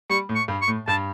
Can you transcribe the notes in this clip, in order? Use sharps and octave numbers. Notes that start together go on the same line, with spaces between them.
G3 C#6
A2
C#6
G2
C#6
A2
G2 A5